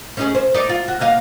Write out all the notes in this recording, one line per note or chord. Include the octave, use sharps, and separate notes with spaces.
C#4 D#4 G#4
C5
D#4 D5
F4
F#4
A#3 D#5 F5